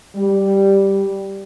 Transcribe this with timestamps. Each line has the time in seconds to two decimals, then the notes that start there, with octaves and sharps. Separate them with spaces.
0.16 G3